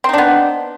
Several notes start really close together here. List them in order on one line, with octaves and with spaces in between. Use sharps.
C4 D#4 D4 B3